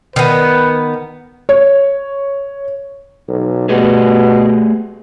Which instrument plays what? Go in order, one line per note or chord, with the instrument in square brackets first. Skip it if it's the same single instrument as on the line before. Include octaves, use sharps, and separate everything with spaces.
[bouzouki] D#3 B3 [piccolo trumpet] B4
[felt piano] C#5
[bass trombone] B1
[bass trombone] B2 [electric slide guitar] A3 G4 G#4